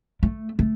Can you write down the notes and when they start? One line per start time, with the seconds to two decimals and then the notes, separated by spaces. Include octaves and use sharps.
0.23 A3
0.59 A3